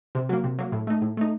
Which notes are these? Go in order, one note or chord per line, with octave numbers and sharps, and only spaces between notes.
C3
F#3 A#3
C3
F#3 A#3
A2
A3 D#4
A2
A3 D#4